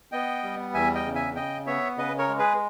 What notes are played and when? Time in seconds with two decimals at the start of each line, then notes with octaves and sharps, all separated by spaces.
0.12 B3 D#5 G5
0.43 G3
0.74 E2 E5 G#5
0.95 D#5 G5
1.05 C#3
1.15 E5 G#5
1.35 C#3 D#5 G5
1.67 B3 C#5 E5
1.97 C#3 B4 D#5
2.18 A#4 C#5
2.29 G#3
2.38 G#4 B4